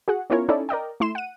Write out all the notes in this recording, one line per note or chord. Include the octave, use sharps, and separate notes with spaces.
F#4 G#4 F#5
B3 C#4 E4 F4 A#4 C#5
C#4 D#4 E4 A4 D5
A#4 D5 D#5 G5
A3 E4 C6 E7
F#5 D#7